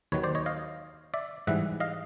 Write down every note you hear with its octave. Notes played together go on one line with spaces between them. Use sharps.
D#2 D#3 F#3 B4 C#5
C5 D5
C#5 D#5
D#5 F5
D5 E5
G#2 E3 G3 E5 F#5
D#5 F5